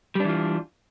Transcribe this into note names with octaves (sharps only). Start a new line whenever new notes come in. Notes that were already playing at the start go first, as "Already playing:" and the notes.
E3 G3 D4 F4